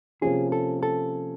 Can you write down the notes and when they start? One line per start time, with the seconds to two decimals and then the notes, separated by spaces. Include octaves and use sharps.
0.21 C3 F3 A#3 C#4 F4 G#4
0.52 A4
0.83 A4